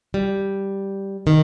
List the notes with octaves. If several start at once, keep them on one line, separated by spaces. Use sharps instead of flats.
G3
D#3